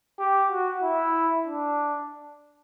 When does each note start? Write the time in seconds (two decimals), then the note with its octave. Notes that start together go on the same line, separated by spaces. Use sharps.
0.19 G4
0.50 F#4
0.83 E4
1.47 D4